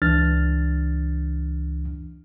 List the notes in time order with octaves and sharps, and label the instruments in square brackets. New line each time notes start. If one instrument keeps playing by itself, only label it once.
[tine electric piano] C#2 E3 D4 F6 A6